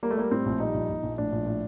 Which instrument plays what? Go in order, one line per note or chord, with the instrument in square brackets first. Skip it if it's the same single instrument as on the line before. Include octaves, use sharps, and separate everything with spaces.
[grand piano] G3 A#3
A3
G3 A#3
A2 C4
A#1
G3 D#4
A#1
A#1
A#1
A2 D4
A#1
A2